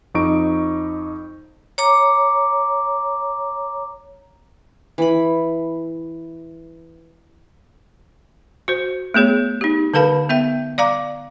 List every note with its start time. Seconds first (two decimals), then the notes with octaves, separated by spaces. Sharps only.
0.15 F2 D#4 C#6 D7
1.78 C#5 A#5 D6
4.98 E3 B5
8.68 F#4 C5
9.14 A3 B3 G#4 C#5
9.61 D#4 G4
9.94 D3 A4 B4 F5 A5 B5
10.29 B3 E5 G5
10.78 D5 F5 A#5 D6